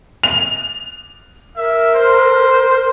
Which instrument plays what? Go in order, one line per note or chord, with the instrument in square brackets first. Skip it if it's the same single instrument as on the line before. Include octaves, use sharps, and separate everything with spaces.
[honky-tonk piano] F7
[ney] A#4 [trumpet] E5
[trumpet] C5